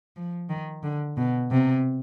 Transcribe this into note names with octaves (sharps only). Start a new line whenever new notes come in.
F3
D#3
D3
B2
C3